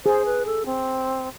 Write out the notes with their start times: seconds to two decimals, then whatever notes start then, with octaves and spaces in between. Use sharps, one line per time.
0.05 G#4 C5
0.25 B4
0.46 A4
0.66 C4